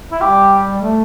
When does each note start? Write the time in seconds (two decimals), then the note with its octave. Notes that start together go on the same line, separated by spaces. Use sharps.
0.12 E4
0.21 G3 G4
0.82 A3